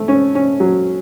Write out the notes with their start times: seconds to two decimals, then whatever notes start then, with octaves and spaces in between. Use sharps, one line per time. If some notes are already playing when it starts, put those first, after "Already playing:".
Already playing: A3
0.08 C#4
0.35 C#4
0.60 F#3